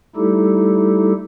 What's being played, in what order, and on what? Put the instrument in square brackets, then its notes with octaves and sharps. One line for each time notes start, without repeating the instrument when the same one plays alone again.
[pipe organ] G3 A3 D#4 E4 G4 A4